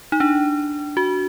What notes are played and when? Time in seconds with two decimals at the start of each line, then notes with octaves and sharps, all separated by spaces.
0.12 D#4
0.20 D4
0.97 F#4